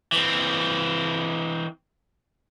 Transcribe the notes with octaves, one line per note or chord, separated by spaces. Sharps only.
E3 C4